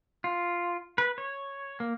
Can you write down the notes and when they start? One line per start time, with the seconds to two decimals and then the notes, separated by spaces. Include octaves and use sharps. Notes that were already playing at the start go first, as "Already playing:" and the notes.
0.24 F4
0.98 B4
1.18 C#5
1.80 A#3